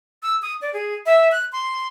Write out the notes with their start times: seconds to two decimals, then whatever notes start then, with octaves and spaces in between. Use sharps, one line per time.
0.23 E6
0.42 D#6
0.62 D5
0.74 G#4
1.06 E5
1.32 F#6
1.52 C6